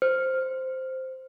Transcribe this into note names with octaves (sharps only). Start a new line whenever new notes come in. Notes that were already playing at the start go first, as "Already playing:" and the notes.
C5